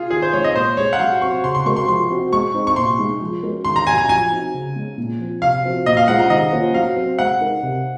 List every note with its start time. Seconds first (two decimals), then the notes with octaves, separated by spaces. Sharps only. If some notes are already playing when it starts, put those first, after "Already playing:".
Already playing: F4 G#4
0.10 D#3 G#4
0.22 C5
0.33 G#3 C4 D#4 C#5
0.44 D#5
0.55 A#2 C5
0.77 G#3 C#4 G#4 C#5
0.93 F#5
0.99 F#3 F5
1.22 C4 F#4 C5 C#6
1.44 C#3 C6
1.55 C6
1.66 G#3 C4 F#4 A#4 C#6
1.77 C6
1.88 F3 C6
2.10 C4 F#4
2.33 G#3 C#6
2.54 C4 D#4
2.67 C#6
2.76 A#2 C6
2.99 G#3 D#4
3.21 F3
3.43 G#3 C#4 F#4 A#4
3.65 D#3 C6
3.76 A#5
3.87 F#3 C#4 G#5
3.98 A#5
4.09 F3 G#5
4.32 C4 D#4 F#4
4.54 C#3
4.76 G#3 C#4
4.98 A#2
5.19 F3 C4
5.42 C3 F5
5.64 F3 C4 F#4 C5
5.86 A#2 D#5
5.97 F5
6.08 G#3 C#4 F4 C5 F#5
6.19 A#5
6.30 D#3 D#5
6.53 A#3 C#4 F4 C5
6.74 F#3 F5
6.96 C4 F#4 C5
7.19 G#3 F#5
7.40 D#4 A#4
7.63 C3